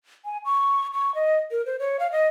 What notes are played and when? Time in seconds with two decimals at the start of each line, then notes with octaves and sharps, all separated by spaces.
0.25 G#5
0.45 C#6
0.94 C#6
1.15 D#5
1.51 A#4
1.66 C5
1.80 C#5
2.00 F5
2.12 D#5